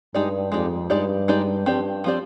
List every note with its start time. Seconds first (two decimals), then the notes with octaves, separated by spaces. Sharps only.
0.14 G2 G#3 D#4 G4 D5
0.52 F2 G#3 D#4 G4 D5
0.90 G2 G#3 D#4 G4 D5
1.28 G#3 D#4 G4 D5
1.66 G2 F3 C4 G4 D5
2.04 F3 C4 G4 D5